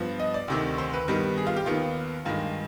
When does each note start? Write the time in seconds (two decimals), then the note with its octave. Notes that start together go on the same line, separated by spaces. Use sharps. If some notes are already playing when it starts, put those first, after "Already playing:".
Already playing: G2 F3 B3
0.20 D#5
0.34 D5
0.48 D2 C3 D#3
0.78 C5
0.93 B4
1.08 G2 D#3 G3 B3
1.37 G#4
1.47 F4
1.56 G4
1.66 D#2 D#3 B3 F4
2.25 G2 D#3 G#3 F4